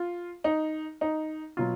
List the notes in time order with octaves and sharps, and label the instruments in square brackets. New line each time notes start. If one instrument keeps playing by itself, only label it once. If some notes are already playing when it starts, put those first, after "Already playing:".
Already playing: [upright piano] F4
D#4
D#4
B2 F#3 F4